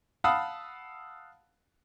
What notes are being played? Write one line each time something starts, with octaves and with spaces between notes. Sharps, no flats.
F5 F#5 A5 B5 D#6 E6